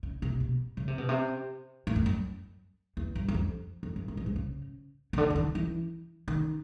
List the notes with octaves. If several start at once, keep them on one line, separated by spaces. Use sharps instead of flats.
C#3
C3
B2
C#3
C3
B2
C3
A2
F#2
F#2
E2
G2
F#2
F2
F2
G2
F#2
G2
G#2
C#3
C#3
D3
E3
D#3
E3
D#3